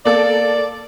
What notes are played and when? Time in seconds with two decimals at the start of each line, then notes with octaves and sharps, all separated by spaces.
0.05 A#3 A4 D5